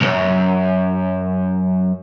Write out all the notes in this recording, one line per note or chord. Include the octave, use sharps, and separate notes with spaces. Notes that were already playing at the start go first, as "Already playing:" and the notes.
B1 F#2